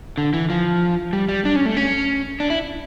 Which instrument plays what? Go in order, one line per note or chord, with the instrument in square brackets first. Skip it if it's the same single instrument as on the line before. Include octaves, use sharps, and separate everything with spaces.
[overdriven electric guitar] D3
E3
F3
G3
G3
D4
C#4
A3
C#4
D4
E4